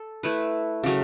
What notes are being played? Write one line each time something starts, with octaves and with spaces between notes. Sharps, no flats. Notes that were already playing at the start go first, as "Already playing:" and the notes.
Already playing: A4
A3 E4 B4
C#3 F#3 A3